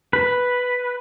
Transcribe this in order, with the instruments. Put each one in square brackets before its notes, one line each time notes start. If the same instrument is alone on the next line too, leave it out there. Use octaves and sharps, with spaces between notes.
[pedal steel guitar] B4